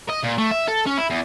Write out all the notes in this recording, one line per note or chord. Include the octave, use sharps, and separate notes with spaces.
D#5
A#2
A3
E5
A4
C#4
E4
E2